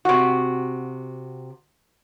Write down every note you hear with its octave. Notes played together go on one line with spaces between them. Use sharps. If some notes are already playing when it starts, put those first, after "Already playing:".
C3 F#4